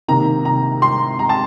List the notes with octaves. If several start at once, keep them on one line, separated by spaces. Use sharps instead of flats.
C3 D#3 A#3 A#5
A#5
C6
A#5
A5